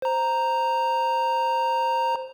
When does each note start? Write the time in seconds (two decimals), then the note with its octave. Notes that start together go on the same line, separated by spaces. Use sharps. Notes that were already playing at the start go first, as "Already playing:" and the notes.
0.02 C5 A#5